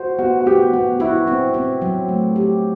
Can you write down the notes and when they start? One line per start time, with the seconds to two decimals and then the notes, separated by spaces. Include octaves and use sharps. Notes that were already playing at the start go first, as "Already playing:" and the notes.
Already playing: F#4 C5
0.19 B3 F#4
0.41 F#4
0.46 B3 G4
0.73 B3 F#4
1.00 E4 F#4
1.27 C4
1.54 C4
1.82 F#3
2.09 A3
2.36 G4